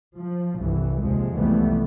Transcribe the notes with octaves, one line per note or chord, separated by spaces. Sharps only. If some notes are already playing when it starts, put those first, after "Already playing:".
F3
G1 C2 G2 E3
D#2 C3 F3 G#3
C2 F2 E3 G3 A3 B3